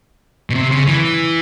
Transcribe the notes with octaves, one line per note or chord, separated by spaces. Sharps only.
B2
C3
C#3
E3